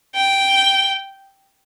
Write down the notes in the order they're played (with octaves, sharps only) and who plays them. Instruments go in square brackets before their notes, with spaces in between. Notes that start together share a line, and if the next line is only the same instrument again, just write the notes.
[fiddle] G5